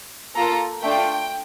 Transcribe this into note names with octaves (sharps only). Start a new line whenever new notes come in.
A#3 F4 A4 A#5
A3 D4 F4 G5